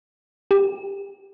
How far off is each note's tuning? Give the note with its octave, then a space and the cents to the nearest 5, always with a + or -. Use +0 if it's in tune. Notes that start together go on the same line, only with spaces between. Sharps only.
G4 +15